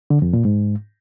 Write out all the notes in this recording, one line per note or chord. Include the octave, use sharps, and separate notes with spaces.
D3
F2
A#2
G#2